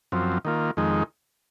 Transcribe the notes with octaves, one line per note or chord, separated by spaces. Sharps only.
F#2 F3 C4
D#3 A#3 F4
F2 D#3 G#3 D#4